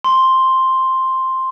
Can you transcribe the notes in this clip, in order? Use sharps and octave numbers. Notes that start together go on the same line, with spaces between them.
C6